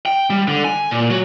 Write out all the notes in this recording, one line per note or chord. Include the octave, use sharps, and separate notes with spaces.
G5
G3
D3
G#5
A#2
F#3